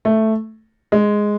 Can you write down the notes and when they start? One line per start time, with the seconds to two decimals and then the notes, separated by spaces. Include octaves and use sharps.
0.05 A3
0.92 G#3